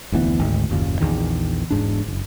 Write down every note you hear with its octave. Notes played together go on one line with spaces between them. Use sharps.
F1 D2 E3 B3
G#1 D2 G#2
F#1 D#2 A#2
A#1 E2 D#3
E1 G#2 D4
F#1